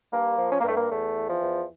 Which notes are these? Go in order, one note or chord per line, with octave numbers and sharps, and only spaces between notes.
G2 A#3
F3
C#4
A#3
G2 A3
A#3
E2 A3
E3
F3
E2